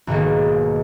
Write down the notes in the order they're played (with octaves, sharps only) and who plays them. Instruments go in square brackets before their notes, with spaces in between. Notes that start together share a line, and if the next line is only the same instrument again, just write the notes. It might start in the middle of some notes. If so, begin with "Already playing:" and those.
[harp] B1 G#2 D#3 A#3